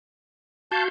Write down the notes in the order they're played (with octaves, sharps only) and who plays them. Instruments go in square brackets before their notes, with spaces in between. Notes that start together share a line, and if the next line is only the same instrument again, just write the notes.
[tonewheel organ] F#4 F5 G6 [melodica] A5